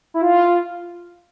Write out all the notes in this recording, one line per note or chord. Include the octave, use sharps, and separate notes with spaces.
E4
F4